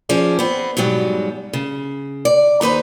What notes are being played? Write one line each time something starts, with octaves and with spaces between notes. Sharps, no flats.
F3 C#4 G#4 D5
B3 C4
G#2 B2 F#3 G3
C#3
D5
D#2 D#4 B4 C5